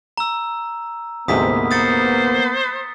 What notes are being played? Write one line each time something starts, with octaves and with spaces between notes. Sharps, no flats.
A#5 E6
D2 G#2 C3 A#3 B3 D#6 B6
C5 D#6 A6 C#7